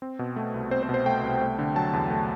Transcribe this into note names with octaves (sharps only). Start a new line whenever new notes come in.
C4
B2
A3
C2
C4 C5
C5
B2
C5
A3 G5
C2
A3
D3
F#3 A5
E2
A3